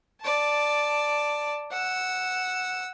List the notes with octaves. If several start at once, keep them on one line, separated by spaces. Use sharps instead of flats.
D5 A5
F#5 E6